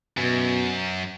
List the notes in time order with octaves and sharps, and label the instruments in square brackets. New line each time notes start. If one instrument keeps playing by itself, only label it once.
[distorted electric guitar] F#2 [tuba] B2